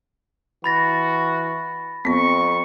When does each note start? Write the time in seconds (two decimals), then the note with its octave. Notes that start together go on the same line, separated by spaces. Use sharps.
0.64 E3 F#4 B5 A6 A#6
2.05 F2 B3 C4 C#6